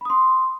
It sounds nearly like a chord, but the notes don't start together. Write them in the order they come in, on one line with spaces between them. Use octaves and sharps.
B5 D#6 C6